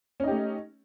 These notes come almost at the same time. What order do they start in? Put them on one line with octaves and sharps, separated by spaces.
C#4 D#4 G4 A3